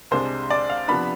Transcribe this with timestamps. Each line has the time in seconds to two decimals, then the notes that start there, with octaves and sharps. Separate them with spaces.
0.11 C2 C3 G#3 D4 C5
0.50 D5
0.70 F5
0.88 C3 F3 B3 D4 B5